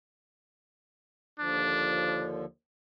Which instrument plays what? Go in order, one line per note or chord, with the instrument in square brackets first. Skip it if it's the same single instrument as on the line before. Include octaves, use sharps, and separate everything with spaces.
[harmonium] D#2 D3 F3 [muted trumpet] D4